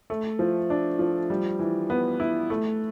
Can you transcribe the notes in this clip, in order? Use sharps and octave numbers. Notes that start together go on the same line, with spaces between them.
A3
F3
D4
F3
G3
E3
B3
E4
A3